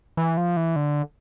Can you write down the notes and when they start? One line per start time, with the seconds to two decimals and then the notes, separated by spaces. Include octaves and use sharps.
0.17 E3
0.37 F3
0.57 E3
0.76 D3